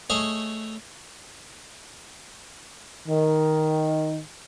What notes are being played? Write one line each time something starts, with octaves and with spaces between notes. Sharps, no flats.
A3 G#4 C#5 D#5
D#3